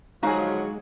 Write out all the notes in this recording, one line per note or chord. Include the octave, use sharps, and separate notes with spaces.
D3 F3 F#3 G#3 D#4 F#4 G#4 F5